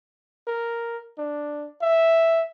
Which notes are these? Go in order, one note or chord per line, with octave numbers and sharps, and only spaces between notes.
A#4
D4
E5